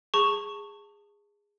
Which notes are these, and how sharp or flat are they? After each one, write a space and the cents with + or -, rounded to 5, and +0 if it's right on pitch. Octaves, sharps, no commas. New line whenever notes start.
G#4 -15 A5 +25 C#6 +0